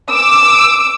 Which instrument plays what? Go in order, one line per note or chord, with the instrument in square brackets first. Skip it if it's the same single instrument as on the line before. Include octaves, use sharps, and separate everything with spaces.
[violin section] D6 E6